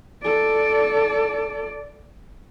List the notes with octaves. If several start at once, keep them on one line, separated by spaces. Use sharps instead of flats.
A4 D5